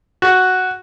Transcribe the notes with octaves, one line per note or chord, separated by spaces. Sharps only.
F#4